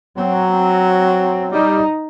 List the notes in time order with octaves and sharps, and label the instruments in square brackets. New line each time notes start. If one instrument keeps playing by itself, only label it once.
[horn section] F#3 [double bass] C4
[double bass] C4
[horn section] G3 [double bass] D#4